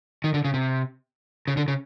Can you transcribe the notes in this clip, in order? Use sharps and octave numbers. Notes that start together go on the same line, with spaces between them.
D#3
D3
C#3
C3
C#3
D3
C#3